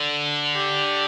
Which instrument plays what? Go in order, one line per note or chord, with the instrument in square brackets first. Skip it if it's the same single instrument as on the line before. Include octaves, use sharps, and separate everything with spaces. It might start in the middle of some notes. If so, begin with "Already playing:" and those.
Already playing: [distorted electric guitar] D3
[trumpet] G4